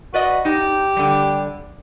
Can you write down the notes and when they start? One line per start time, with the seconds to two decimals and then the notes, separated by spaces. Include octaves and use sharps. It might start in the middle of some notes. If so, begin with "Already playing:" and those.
0.14 F#4 B4 D5 D#5
0.45 D#4 G4
0.96 D3 G3